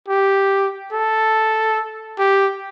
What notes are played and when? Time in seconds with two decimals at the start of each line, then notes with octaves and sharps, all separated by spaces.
0.09 G4
0.93 A4
2.19 G4